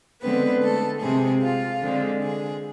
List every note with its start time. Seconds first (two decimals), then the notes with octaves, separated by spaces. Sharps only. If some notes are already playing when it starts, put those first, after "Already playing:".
0.22 D3 G#3 B3 C4 B4
0.63 A3 A4
1.01 C3 G#3 C4 G#4
1.42 F4
1.82 D3 G#3 C4
2.22 G#4